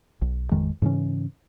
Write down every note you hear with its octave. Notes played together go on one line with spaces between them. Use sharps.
B1
A1 F2 D#3 G#3
G#2 C#3 E3 C#4